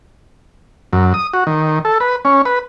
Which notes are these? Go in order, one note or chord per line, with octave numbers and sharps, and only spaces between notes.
F#2
D#6
F#4
D#3
A4
B4
C#4
B4